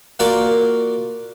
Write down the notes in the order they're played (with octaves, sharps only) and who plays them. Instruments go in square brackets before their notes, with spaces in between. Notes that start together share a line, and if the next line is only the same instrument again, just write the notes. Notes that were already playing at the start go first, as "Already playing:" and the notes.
[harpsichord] A#3 F4 F#4 A#4 D5 D6